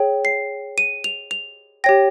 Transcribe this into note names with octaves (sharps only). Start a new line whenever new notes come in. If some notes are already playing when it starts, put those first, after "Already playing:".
Already playing: G#4 C#5 G5
C7
D#7
F7
F7
G4 C#5 G5 A#6